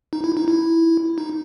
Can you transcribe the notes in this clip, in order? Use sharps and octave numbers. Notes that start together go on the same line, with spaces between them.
D#4
E4
D#4
E4
D#4